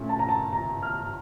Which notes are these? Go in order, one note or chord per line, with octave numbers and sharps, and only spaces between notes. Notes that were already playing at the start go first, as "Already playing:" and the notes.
Already playing: A#2 A3 C#4
A5
A#5
A5
A#5
F6